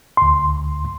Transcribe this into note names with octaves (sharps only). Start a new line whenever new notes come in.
D2 C6